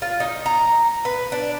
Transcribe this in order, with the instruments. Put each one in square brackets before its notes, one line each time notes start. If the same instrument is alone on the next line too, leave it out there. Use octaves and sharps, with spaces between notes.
[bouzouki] F4
D#4
A#5
B4
D4